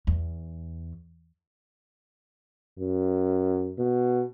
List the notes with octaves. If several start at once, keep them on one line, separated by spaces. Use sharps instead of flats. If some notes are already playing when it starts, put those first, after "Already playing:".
E2
F#2
B2